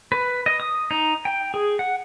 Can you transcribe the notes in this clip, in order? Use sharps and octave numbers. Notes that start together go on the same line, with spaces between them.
B4
D#5
D#6
D#4
G5
G#4
F#5